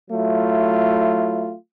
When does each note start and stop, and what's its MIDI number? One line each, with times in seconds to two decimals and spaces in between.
0.11 1.54 54
0.11 1.54 57
0.11 1.54 64
0.11 1.54 65